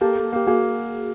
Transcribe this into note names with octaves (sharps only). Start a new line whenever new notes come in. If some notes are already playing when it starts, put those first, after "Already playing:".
A#3 G4 A4
A#3
A#3 G4
A#3 F#4 G#4